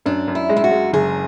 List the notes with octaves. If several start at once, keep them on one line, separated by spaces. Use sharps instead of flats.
F#2 D4
F#2
E4
G#3
E4
F#4
G#3
F#1 G#4